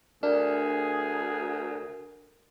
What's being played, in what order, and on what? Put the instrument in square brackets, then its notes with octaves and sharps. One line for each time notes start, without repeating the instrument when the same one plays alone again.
[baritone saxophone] D2 [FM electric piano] D4 [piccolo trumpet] G#4 [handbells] A#4